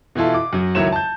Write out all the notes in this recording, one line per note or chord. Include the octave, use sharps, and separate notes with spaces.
B2 E3 E4 F4 A4
D6
F#2 F#3
C#2 D#3 F#3 E4 C#5 E7
A5 G6